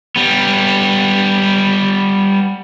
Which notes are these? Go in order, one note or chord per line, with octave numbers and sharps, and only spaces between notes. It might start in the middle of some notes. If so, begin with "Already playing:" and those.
G3 B3